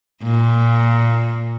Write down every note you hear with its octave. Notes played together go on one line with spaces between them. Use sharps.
A#2